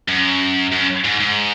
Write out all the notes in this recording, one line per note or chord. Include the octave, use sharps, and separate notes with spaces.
F#2
F#2
G#2
G#2